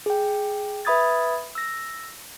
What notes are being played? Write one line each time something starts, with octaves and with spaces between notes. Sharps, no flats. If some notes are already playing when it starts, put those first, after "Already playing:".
G#4 G5
B4 E5 B5 D#6 G#6 A6
E6 A#6